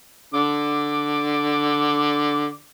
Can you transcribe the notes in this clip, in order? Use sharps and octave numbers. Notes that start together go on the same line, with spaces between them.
D3 D6